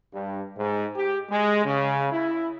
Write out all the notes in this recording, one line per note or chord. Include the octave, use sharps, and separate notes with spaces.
G2
G#2
G4
G#3
C#3
E4